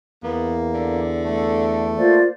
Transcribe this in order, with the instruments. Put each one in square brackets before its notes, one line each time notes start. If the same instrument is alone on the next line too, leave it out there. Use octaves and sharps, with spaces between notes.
[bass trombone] E2 [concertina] A#3 [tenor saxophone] B3
[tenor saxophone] D3
[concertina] A3
[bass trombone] A#3 [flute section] F4 C5 D5